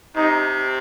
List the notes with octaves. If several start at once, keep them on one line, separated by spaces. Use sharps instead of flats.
C3 D#4